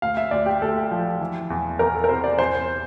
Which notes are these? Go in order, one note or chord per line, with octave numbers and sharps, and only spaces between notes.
D2 F5
E5
D2 D5
G4
D2 A4
F3
E3
E2
E2 A#4
A4
A#4
C3 C5
D5
E2 C5